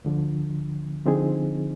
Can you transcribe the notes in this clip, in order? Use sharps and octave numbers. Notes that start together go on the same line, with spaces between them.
D2 D3 F3
D3 F3 C4 D#4 G#4